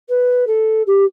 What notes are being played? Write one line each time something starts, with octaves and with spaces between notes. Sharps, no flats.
B4
A4
G4